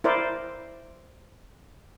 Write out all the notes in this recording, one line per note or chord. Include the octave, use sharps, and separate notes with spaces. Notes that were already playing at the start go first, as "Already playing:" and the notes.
E4 A#4 C5 D5